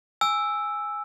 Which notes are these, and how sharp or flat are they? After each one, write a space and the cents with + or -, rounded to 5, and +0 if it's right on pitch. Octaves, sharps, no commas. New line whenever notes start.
G#5 -5 E6 +0